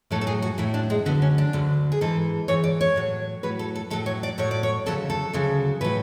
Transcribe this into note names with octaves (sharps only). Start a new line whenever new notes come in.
A2 F#3 A4
A4
G#4
F#4
A2 F#3 E4
D4
G#3
D2 D3 F#3 B3
C#4
D4
D2 D3 F#3
G#4
G#2 E3 A4
G#2 E3 C#5
D5
C#5
A2 F#3
A2 F#3 B4
A4
A4
A2 F#3 A4
C#5
D5
A2 F#3 C#5
D5
C#5
D2 C#3 F#3 A4
A4
D2 C#3 F#3
A2 F#3 B4